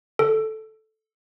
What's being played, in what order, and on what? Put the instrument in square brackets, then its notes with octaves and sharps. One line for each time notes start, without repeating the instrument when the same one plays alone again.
[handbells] A4